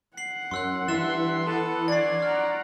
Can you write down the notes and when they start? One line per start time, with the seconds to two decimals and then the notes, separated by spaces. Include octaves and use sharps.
0.17 F#5 C7 F#7
0.51 F#2 C6 E6 F#6
0.88 G2 E3 E5 C6 A6 E7
1.46 B3 A4
1.88 F#3 D4 D5 F#5 G#5 A6 C7
2.22 F#5 A#5 F6